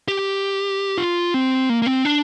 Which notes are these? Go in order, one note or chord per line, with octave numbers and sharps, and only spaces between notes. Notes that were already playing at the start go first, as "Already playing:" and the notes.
G4
F4
C4
A#3
A#3
C4
D4